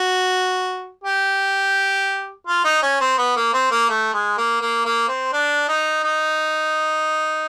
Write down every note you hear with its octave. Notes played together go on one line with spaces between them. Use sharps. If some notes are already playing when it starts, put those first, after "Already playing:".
Already playing: F#4
G4
F4
D#4
C#4
C4
B3
A#3
C4
A#3
A3
G#3
A#3
A#3
A#3
C4
D4
D#4
D#4